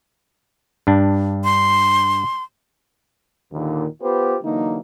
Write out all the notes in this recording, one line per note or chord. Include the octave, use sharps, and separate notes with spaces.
G2 D4
C6
D#2 A#2 D3 D#3
B3 F4 G4 B4 C5
D3 E3 F#3 A#3 D#4